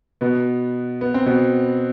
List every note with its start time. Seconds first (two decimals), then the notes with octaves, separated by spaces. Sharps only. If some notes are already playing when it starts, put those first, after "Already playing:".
0.21 B2 B3
1.01 B3
1.14 C4
1.26 B2 B3